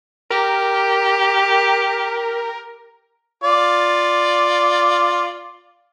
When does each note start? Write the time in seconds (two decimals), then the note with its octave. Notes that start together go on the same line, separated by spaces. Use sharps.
0.30 G4 A#4
3.44 F4 D5